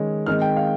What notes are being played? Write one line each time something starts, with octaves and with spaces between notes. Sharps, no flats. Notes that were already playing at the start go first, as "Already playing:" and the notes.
Already playing: D#3 G#3 C#4
D#3 G#3 C4 F6
G5
F5